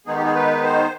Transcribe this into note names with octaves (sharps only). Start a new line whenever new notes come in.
D#3 G#3 B3 D#4 G#4
G4
G#4
B4
C5